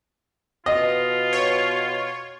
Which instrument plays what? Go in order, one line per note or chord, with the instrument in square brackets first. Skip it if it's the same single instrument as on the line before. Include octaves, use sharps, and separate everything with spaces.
[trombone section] B2 [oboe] F4 [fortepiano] D#5
[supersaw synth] C#5